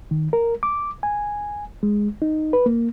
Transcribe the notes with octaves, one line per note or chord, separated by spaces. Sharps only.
D#3
A#4
D6
G#5
G#3
D#4
B4
A#3